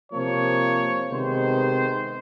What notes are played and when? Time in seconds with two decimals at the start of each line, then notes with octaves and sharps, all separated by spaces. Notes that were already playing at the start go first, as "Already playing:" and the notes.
0.12 C3 F3 A#3 C#5
1.11 C3 D#3 G#3 B3 C5